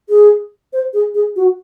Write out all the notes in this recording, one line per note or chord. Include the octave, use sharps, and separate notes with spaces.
G#4
C5
G#4
G#4
F#4